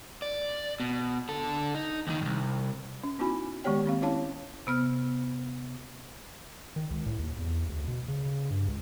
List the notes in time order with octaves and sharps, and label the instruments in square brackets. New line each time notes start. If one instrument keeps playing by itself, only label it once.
[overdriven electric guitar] D5
B2
D3 A4
D#4
D#2 D#3
C2 G2
[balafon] C#4
B3 D#4 E4 F#4 G#5 B5
D#3 G#3 B3 G4 C#5 G5
A#3 C4 F5
C#4 E4 C#5 F5 A5
[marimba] C3 B3 F6
[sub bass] D#3
C#2
A2
D#2
E2
D2
B2
C#3
G2
C#2